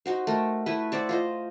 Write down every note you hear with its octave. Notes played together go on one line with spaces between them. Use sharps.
D#4 F#4 C5
A3 A#4
A3 E4 B4
C5 D5 E5 F#5
F4 C5 D#5